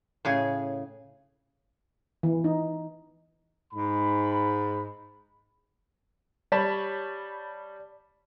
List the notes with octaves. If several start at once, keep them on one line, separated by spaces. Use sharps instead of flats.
A2 C#3 G#4
E3
D#4
G#2 B5
G3 C#5 A5 B5